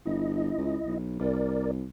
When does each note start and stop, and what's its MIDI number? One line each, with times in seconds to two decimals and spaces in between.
0.06 0.52 31
0.06 0.98 64
0.06 0.98 75
0.57 0.78 37
0.86 1.19 35
1.20 1.87 36
1.20 1.71 70
1.20 1.71 74